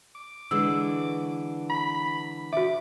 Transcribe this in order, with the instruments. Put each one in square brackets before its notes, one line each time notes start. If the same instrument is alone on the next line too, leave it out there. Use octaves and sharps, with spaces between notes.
[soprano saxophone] D6
[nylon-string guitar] D3 E3 G#3 [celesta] E6
[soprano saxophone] B5
[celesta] F#4 E5 [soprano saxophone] D6